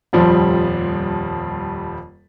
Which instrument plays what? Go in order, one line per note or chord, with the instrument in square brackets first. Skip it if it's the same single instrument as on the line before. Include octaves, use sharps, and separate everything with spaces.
[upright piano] D#1 F2 F3 G3 C5